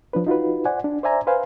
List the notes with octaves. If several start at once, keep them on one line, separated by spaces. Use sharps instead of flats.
F3 D4 B4
D#4 F4 F#4 B4
C5 D5 F#5 G#5
D4
C5 D5 E5 G#5 A#5
B4 C5 F5 G#5